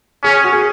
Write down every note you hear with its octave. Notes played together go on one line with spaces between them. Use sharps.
C#4 G#4
F#4
G#4